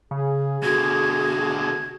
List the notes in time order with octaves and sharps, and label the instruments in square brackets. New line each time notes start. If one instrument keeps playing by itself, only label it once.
[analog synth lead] C#3 [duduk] G#4
[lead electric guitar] B2 D3 [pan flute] F#4 [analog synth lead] G#6